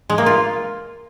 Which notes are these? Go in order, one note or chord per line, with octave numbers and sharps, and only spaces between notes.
G#3
A#3
F4